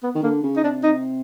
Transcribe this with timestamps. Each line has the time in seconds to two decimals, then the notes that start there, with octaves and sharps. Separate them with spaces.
0.03 B3
0.15 D#3
0.23 D3 A#3
0.43 C#3
0.56 D#4
0.63 C3 D4
0.83 D#4